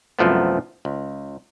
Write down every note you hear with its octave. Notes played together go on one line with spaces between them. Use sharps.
C2 F#2 F3 A3 B3
C#2